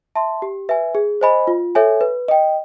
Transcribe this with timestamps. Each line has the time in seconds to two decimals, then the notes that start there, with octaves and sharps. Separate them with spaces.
0.16 E5 A5 C6
0.42 G4
0.69 B4 E5 G#5
0.95 G#4
1.21 C5 D#5 G#5 B5
1.47 F4
1.75 A4 C#5 E5 G#5
2.01 B4
2.28 D#5 G5